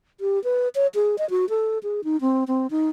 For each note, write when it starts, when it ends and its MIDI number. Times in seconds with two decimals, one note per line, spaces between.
0.20 0.42 67
0.44 0.69 71
0.75 0.87 73
0.95 1.18 68
1.18 1.28 75
1.30 1.49 66
1.49 1.78 69
1.83 2.04 68
2.04 2.20 63
2.21 2.44 60
2.48 2.67 60
2.71 2.90 63